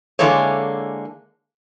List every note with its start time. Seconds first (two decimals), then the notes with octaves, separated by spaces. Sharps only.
0.19 D3 E3 G#3 A#3 A4 C#5